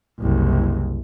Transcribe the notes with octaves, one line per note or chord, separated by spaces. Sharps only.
F#1 C2